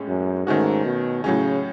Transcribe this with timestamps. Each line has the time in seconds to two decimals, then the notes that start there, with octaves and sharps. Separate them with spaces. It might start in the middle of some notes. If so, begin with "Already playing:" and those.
Already playing: A2 G#3 C#4
0.08 F#2
0.46 G#2 D#3 A3 C#4 F#4
0.85 B2
1.24 A2 C#3 F#3 C#4